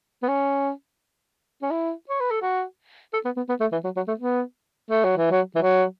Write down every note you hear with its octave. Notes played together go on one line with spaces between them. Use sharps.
B3
C#4
C#4
E4
C#5
B4
A4
F#4
A4
B3
B3
B3
A3
E3
F#3
F#3
A3
B3
A3
F#3
E3
F#3
E3
F#3